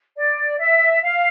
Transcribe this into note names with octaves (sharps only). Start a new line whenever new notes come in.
D5
E5
F5